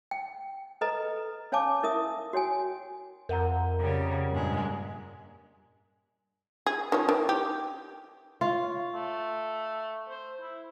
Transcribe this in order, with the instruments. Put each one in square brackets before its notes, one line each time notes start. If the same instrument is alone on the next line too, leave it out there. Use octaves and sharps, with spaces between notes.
[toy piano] G5
A4 B4 D#5 A#5
C#4 C#5 F5 G#5 A5 D6
E4 A#4 E5 D#6
F#4 C#5 G5 G#5
[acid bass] F2 [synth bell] A#4 F#5 A#5
[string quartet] C#3 G3
G2 A#2 G#3
[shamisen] G#4
D#3 F3 C#4
D#3 E3
G4
[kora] F4 [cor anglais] C#5
[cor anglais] A3
C5
E4